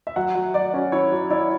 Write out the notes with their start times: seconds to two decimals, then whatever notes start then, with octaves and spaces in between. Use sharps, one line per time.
0.07 E5
0.16 F#3 F#5
0.35 F#3
0.54 F#3 D5
0.74 C#4
0.92 E4 C#5
1.11 F#3
1.31 E4 D5